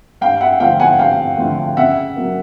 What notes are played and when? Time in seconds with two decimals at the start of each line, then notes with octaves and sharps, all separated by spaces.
0.21 G2 F5 G5
0.41 E5 F#5
0.60 D3 F3 A3 F5 G5
0.80 F#5 G#5
0.99 G2 F5 G5
1.38 D3 F3 A3
1.77 C#3 E5 F#5
2.16 F#3 A#3